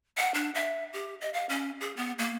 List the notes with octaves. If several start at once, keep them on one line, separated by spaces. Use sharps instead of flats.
F#5
D4
E5
G4
D#5
F5
C#4
G#4
B3
A#3